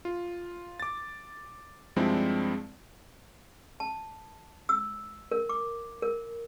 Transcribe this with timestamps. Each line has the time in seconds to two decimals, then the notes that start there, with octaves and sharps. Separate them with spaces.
0.05 F4
0.80 D6 A6
1.96 G2 F3 G#3 C4 D4 E4
3.80 A5
4.69 E6
5.32 A#4
5.49 D6
6.02 A#4